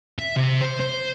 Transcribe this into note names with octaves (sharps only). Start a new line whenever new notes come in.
E5
C3
C5
C5